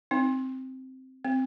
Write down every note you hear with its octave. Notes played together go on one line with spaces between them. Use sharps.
C4 D#4
C4